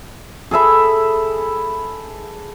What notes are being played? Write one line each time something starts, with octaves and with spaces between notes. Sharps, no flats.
G#4 A4 E5 B5